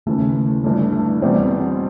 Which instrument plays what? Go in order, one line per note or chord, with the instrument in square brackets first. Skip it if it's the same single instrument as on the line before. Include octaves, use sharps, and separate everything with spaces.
[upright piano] D#2 C#3 E3 [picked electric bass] A3
[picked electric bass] A3
[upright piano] G1 G2 E3 [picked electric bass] A3
[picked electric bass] A3
[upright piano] E2 B2 G3 C4 [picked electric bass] A3
[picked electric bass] B3
C4